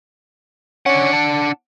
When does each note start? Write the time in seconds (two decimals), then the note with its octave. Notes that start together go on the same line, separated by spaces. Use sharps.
0.86 C#4 D4 F#5
1.13 A5